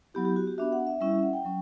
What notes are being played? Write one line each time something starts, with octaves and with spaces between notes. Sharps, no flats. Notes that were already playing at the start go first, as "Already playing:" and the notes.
F#3 B3 E4 G4
G4
F#4
G4
B3 D4 F#4 E5
F#5
E5
G3 C#4 E4 E5
E5
F#5
G5
F#3 C#4